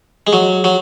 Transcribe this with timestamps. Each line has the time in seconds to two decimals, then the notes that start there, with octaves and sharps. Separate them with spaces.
0.27 G#3
0.33 F#3
0.64 F#3